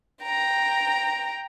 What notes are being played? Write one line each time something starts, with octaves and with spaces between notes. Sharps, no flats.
G5 A#5